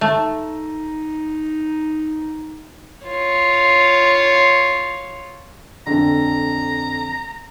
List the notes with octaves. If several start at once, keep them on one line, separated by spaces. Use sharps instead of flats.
A3 D#4
F4 C#5
F2 D3 A#5